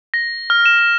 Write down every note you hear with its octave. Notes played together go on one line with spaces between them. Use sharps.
A#6
F6
E7
F6